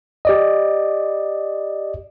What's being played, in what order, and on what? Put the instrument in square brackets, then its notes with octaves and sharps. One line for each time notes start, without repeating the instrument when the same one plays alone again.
[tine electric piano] G4 D5 D#5